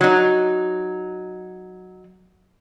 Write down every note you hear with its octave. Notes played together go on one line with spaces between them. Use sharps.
F#3 D#4